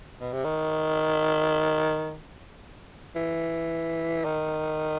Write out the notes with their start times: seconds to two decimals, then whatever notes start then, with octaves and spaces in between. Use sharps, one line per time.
0.21 B2
0.33 C3
0.45 D#3
3.16 E3
4.25 D#3